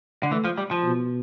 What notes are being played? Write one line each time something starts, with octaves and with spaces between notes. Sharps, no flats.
D3
E3 A3
F3
G3
F3
B2